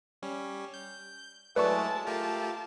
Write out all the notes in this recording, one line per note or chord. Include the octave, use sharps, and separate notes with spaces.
G3 C#4
G6
F#3 G#3 A3 E4 B4 D5 A5 C#6
A3 F4 G4 A#4 A5